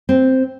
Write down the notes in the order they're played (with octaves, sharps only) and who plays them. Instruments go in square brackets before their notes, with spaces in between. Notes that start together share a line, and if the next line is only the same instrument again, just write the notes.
[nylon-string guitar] C4